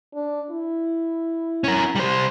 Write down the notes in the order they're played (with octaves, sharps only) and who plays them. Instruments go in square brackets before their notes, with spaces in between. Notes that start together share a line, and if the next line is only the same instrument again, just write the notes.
[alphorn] D4
E4
[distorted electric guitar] C#4 A#4
G3 C5